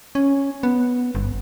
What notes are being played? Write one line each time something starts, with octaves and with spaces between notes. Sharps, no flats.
C#4
B3
G1